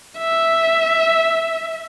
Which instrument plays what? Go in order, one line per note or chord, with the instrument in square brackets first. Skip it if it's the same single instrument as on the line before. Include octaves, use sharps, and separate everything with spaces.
[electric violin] E5